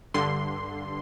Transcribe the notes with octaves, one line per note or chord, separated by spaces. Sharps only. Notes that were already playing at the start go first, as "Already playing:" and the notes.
G2 D3 C6